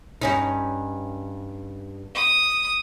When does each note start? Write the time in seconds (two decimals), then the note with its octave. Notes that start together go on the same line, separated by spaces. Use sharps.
0.21 G2 C#4 D#4
2.15 D#6